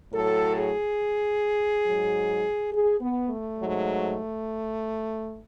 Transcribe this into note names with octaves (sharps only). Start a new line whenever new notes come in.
A2 F#3 A4
G#4
G#2 F#3
G#4
B3
A3
G#2 F#3